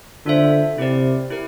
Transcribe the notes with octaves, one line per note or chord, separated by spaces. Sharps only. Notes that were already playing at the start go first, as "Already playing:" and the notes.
D3 D4 F4 A4 C5 E5
C3 E4 G4 A#4 D5
E4 G4 A#4